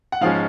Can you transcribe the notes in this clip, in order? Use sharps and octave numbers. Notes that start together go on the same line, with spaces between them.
F#5
G#2 F3 G#3 C#4 F5